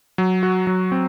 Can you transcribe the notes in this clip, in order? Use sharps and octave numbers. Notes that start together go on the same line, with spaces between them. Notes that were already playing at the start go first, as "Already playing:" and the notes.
F#3
F#4
F#3
C4